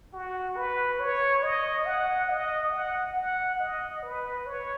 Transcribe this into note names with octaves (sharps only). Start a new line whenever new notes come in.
F#4
B4
C#5
D#5
F#5
D#5
F#5
F#5
D#5
B4
C#5